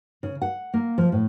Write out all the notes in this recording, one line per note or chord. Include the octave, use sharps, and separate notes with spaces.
C#3
F#5
A#3
F3
A2